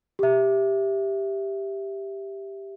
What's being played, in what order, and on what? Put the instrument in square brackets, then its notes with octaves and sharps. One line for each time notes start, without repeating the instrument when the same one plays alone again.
[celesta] G4 E5